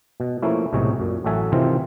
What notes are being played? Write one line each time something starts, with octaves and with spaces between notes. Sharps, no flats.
B2
F3 A3 A#3 C#4 E4
B1 A2 C3 G#3 C#5
F#2 A#2
A1 F#3 F#4 A4 E5 G#5
C3 D#3 E3 C4 F4